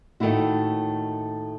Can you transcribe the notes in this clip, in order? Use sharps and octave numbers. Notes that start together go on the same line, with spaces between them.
A2 D#3 A3 A#3 E4 F#4